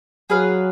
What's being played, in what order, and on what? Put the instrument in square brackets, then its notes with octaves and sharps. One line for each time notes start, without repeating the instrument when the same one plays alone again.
[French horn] F#3 [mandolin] G#4 B4 F5